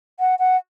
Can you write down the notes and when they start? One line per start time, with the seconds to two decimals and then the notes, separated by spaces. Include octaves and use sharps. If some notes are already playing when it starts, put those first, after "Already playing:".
0.20 F#5
0.39 F#5